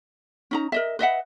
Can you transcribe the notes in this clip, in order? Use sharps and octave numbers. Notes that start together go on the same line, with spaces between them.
C#4 D#4 A#5
A#4 D#5 E5
B4 D#5 E5 F#5